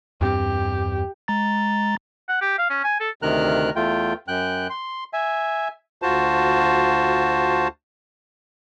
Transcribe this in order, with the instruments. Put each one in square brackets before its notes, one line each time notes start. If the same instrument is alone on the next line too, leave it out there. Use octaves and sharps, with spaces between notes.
[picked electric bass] E2 G2 C4 [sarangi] G4
[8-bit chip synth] G#3 A#5 A6
[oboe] F#5
G4
F5
C#4
G#5
A4
[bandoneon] D2 C3 D#3 A#4 F6 F#6
E2 A3 F4 G5
F#2 G5 F#6
C6
E5 G#5
D2 F4 F#4 C5 A5